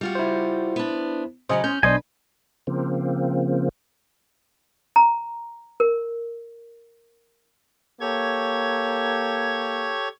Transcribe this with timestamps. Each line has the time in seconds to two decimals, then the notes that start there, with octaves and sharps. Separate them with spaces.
0.01 G3 F4 F#4
0.15 E4 C5
0.76 B3 D4
1.49 C#3 F#3 C#4 C5 D#5 G#5
1.64 C#4 G6
1.83 B1 D4 B4 C5 D#5 G#5
2.67 C#3 F3 A#3 C4
4.96 A#5
5.80 A#4
8.01 A#3 G4 A4 C#5 C#6 G#6